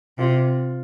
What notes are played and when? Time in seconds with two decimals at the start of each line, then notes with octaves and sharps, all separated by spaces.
0.18 C3 F4